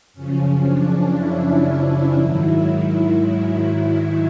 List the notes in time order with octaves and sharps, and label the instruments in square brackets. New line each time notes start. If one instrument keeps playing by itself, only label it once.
[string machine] F#2 C#3 F3 C#4
D4
E4
E4
G#2 D#3 F#3